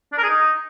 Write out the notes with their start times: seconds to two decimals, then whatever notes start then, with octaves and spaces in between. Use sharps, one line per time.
0.12 D4
0.18 A#4
0.23 G#4
0.29 D#4